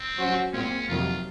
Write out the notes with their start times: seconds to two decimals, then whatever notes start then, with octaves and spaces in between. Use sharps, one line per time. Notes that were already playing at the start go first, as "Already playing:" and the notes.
Already playing: C4
0.17 F#3 C#4 F#4 C5
0.53 A#2 G#3 C4 C#4
0.88 F2 C3 D#3 F#3 F4